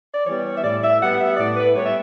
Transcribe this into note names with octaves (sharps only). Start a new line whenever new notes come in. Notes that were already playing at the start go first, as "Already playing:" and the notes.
D5
E3 G3 B3 C#5
E5
A2 D5
E5
G3 B3 F#5
E5
A2 D5
B4
G3 B3 C#5
E5